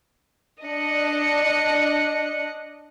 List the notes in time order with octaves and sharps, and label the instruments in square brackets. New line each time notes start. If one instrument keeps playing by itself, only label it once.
[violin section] D4 D#5 F#6 C#7